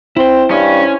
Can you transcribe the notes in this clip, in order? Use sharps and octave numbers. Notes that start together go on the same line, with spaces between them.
C4 E4 C5
G2 C#4